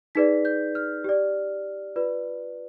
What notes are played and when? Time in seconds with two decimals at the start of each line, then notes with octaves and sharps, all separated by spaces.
0.15 D#4 G#4 B4 D5 B6
0.45 G6
0.75 F6
1.04 G4 D5
1.96 F4 B4 D5